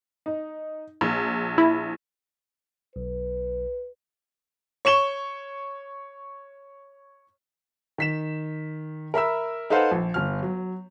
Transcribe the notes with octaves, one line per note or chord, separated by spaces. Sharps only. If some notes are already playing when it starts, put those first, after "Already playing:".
D#4
A#1
E4
B1 B4
C#5 C#6 E7 G7
D#3 B6 E7
A#4 E5 B5 E6
D#4 A4 B4 C5 F5 F#5
A#1
G1 F6
F#3